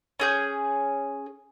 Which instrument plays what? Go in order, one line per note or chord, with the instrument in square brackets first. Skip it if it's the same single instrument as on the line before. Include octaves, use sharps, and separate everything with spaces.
[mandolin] C#4 G#4 G6